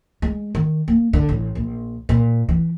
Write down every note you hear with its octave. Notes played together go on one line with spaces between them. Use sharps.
G#3
D#3
A#3
D3
A1
A#1
A#2
E3